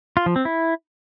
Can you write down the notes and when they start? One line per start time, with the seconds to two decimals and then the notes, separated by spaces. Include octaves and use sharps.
0.17 F4
0.26 F3
0.36 C4
0.45 E4